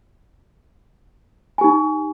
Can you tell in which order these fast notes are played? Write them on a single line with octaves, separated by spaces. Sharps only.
G#5 G4 D#4